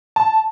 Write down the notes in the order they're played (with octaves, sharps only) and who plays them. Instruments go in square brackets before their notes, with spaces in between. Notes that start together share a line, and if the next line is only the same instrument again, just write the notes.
[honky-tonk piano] A5